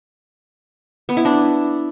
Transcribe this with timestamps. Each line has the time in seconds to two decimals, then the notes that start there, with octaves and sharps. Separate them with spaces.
1.09 B3
1.17 E4
1.25 D4